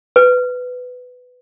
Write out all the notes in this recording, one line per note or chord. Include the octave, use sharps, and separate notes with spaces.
B4